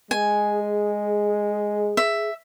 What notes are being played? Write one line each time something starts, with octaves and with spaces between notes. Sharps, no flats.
G#3 G#4 G#5
G#4
E5